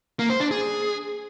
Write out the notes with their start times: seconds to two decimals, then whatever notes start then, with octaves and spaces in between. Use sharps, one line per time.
0.19 A#3
0.30 C5
0.40 D4
0.51 G#4